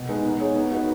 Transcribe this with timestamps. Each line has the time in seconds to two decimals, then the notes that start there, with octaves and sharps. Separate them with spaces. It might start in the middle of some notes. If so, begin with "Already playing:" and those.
Already playing: B2
0.09 G#3 D#4 B4
0.24 B3
0.40 D#4 G#4 C#5
0.56 B3
0.72 D#4 F#4 B4